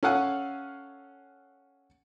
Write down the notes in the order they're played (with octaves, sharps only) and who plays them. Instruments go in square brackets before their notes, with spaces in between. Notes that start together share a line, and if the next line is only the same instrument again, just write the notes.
[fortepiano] C#4 A4 F5 F#5 G#5